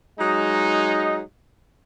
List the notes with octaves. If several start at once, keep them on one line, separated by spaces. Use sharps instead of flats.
F#3 G#3 D#4